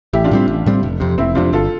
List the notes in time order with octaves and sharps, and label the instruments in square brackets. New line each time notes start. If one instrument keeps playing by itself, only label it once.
[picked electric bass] A1 [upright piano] E4 G4
[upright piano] D4 F4
[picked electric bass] A2 G3 C4
A1
A2 G3 C4
F1
F2 C3
[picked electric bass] F1 [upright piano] C4 E4
[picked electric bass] F2 C3 [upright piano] D4 F4
[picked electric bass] G1 [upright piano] F4 A4